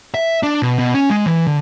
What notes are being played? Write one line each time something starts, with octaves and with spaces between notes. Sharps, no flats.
E5
D4
B2
B2
C#4
G#3
E3
D3